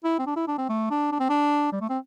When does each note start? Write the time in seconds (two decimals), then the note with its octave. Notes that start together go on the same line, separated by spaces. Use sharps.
0.04 E4
0.19 C4
0.26 D4
0.36 E4
0.48 D4
0.58 C4
0.69 A3
0.91 D4
1.12 D4
1.20 C4
1.29 D4
1.72 G3
1.81 A3
1.89 C4